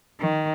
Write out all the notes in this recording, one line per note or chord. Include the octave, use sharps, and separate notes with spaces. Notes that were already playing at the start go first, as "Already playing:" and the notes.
D#3